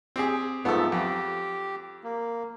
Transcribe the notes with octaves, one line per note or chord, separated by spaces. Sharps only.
C4 G4 G#4
G#2 F3 A3 B3 A4
F2 G4
A#3